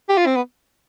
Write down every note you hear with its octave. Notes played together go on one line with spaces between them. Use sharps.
G4
F4
C4
B3